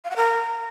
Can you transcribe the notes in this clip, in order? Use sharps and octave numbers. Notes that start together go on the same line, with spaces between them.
F5
F#5
A#4